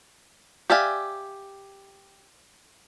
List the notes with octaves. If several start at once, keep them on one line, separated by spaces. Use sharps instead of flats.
G4 D5 E5 F5 G#5